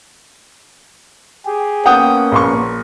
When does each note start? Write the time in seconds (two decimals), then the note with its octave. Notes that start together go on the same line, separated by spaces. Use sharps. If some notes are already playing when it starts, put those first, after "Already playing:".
1.46 G4 G#4
1.86 A#3 B3 C#4 F#5 G5 D#6
2.32 A#1 C6 C#6